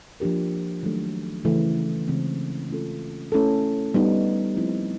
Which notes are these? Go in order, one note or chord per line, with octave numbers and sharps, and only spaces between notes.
F3 A#3 D4 G4 A#4
D#3 F#3 A3 D4
C#3 E3 A3
C#3 E3 G#3 C4
A3 C#4 F4 A4
A3 C#4 E4 A4
G3 B3 D#4
F3 A3 C4 E4